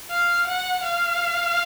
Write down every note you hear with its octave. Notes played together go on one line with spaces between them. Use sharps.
F5
F#5
F5